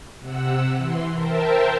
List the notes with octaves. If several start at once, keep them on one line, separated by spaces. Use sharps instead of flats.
C3 F#5 E6
E3 C6
A#4 C5 E5 G5 A5